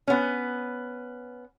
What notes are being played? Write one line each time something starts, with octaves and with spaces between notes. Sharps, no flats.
B3 C#4